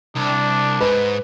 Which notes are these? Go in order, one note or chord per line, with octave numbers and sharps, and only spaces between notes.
C2 D4
G#2 B4